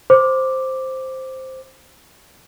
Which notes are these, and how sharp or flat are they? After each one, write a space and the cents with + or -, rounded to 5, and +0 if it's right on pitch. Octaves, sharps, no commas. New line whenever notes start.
C5 +0 D6 +0